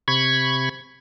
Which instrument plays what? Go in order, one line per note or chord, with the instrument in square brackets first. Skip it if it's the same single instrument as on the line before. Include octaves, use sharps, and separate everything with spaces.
[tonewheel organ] C3 B5 C#6 G#6